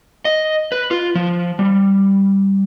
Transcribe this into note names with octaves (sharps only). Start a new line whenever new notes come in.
D#5
B4
F4
F3
G3